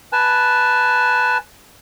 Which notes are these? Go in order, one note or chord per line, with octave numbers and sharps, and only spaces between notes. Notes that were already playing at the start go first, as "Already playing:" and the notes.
B4 G#5 A5